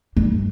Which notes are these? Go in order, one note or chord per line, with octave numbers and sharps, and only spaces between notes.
G2